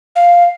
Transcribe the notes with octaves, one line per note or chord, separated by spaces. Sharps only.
F5